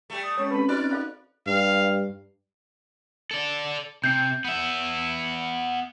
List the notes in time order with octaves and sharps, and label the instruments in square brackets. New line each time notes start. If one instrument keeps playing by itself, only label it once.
[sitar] G3 A3
[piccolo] D#6
[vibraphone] G#3 C#4 A4 [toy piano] C#5
[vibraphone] C4 C#4 [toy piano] B4 A5 [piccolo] B5
[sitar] D#4 D5 [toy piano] F#4 C5 [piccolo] F#6
[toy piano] A4 F5 B5 [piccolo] F#6
[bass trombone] G2 [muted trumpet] F5
[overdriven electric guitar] A4 D5
[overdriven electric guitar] C3 [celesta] G6 C7
[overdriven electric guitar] B3 E5